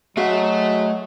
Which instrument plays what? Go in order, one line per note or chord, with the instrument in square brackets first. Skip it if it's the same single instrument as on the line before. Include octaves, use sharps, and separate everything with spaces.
[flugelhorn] F#3 [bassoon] G#3 [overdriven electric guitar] A3 E5 [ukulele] F#4 F5